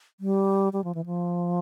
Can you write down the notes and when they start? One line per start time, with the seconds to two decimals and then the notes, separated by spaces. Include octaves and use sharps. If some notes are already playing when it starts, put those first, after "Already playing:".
0.20 G3
0.73 G3
0.84 F3
0.94 E3
1.06 F3